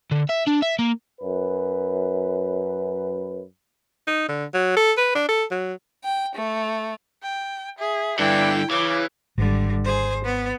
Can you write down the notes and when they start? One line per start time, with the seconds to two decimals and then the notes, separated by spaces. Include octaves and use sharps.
0.11 D3
0.29 E5
0.47 D4
0.62 E5
0.79 A#3
1.20 F#2 B4
4.07 D#4
4.28 D3
4.54 F#3
4.76 A4
4.97 B4
5.15 D4
5.29 A4
5.51 F#3
6.03 G5
6.34 A3
7.23 G5
7.79 G#4 E5
8.19 G2 D3 E3 D4 E4 G5
8.71 C#3 E3 D6
9.38 G#1 D3 G3
9.85 G#4 C5
10.24 B3